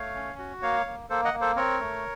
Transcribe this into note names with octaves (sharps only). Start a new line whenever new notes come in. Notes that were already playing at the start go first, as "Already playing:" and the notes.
Already playing: A3 C#5 F5
C#4
F#4
A#3 C#5 F5
A#3
A#3 A4 C5
D#5 F#5
A#3
A4 C5
C4 A#4 C#5
A3